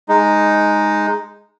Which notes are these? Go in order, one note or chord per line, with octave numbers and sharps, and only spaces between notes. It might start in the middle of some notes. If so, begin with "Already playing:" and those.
G#3 D#4